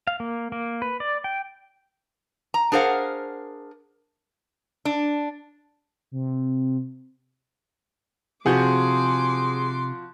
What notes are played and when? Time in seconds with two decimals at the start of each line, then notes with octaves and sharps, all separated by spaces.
0.07 F5
0.20 A#3
0.52 A#3
0.82 B4
1.00 D5
1.24 G5
2.54 A#5
2.72 D4 G#4 A#4 C5 F5 F#5
4.85 D4
6.12 C3
8.46 C3 F3 F#4 G#4 F#5 C6 D6 G6